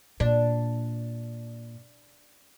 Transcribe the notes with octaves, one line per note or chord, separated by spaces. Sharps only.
A#2 D4